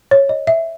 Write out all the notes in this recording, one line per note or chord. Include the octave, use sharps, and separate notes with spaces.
C#5
D#5
E5